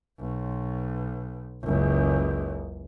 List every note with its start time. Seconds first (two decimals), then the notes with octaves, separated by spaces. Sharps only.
0.20 B1
1.63 F#1 C#2